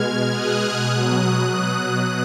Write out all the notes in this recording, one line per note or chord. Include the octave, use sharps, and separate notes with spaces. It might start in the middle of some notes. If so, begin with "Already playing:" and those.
Already playing: B2 G#3 F6 G#6
D#6 F#6
B2 F#3
D#6 F#6